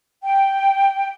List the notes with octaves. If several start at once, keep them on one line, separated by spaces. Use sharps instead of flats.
G5